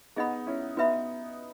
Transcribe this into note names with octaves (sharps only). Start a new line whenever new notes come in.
B3 D#4 G#4 D#5 F#5 B5
C#4 E4
B3 D#4 F#4 B4 E5 B5